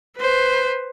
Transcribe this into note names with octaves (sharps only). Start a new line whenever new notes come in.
B4 C5